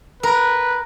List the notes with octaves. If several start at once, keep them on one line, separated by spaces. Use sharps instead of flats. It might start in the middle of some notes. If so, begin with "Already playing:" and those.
A#4 B4